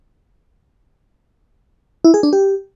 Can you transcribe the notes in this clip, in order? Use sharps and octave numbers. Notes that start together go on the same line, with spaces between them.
E4
G#4
D4
G4